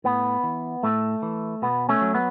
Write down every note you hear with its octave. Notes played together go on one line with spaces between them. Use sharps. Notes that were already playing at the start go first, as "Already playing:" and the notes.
A2 B3
E3
A2 A3
E3
B2 B3
A3 C#4
F#3
B3